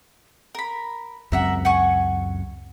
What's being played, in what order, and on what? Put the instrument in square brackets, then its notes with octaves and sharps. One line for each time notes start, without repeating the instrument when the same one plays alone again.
[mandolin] A#4 B5
[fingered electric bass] C#2 F#2 C4 [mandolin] A#4 E5 F#5
[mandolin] F#5 G#5 C#6